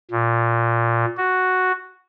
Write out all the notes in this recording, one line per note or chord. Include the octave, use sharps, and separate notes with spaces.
A#2
F#4